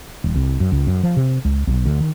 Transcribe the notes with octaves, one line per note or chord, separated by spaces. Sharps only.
D#1
C2
F#2
C#2
F#2
F3
C3
C#2
B1
D2
D#3